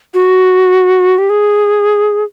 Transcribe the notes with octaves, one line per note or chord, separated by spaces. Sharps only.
F#4
G4
G#4